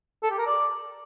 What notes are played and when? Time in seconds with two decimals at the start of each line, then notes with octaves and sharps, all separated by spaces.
0.23 A4
0.31 G4
0.38 A#4
0.46 D5